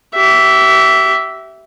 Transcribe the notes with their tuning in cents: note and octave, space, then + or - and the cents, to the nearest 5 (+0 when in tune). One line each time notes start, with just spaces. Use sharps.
G4 -40 E5 +0